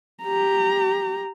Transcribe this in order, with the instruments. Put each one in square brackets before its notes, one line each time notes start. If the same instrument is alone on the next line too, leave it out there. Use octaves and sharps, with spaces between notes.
[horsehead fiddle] G4 A#5